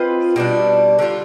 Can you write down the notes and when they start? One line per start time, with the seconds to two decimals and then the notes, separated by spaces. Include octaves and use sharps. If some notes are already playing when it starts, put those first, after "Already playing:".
Already playing: C4 F4 B4 D#5
0.36 B2 G3 D4
0.99 D3 G3 D4 F4